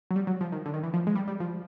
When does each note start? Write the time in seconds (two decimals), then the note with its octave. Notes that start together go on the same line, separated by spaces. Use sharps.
0.11 F#3
0.16 G3
0.27 F#3
0.41 F3
0.52 D#3
0.66 D3
0.74 D#3
0.84 E3
0.94 F3
1.07 G#3
1.15 G3
1.28 G3
1.40 F3